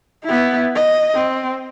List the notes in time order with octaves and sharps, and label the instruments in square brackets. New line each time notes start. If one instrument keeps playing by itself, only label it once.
[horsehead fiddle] B3 E4
D#5
C4